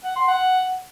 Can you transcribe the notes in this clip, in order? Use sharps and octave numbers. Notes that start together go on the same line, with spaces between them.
F#5
C6
F#5